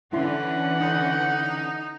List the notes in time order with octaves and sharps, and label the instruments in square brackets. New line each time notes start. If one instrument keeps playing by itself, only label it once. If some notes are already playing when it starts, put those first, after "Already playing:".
[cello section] D3 E3 C#4 [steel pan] E4 C6 [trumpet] F#5
[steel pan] D4 D#6 [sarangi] D#4